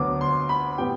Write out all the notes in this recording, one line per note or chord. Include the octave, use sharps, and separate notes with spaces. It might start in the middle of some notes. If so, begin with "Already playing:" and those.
Already playing: D2 D3 F#3 B3 D6
C6
B5
A2 G3 B3 G5